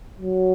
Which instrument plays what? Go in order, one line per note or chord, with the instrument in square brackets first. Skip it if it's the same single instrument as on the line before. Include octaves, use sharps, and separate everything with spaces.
[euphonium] F#3